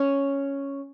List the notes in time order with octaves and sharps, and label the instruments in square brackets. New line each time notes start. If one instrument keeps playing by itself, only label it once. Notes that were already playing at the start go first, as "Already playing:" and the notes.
Already playing: [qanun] C#4